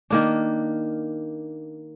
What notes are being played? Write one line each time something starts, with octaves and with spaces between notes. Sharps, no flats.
D#3 A#3 D4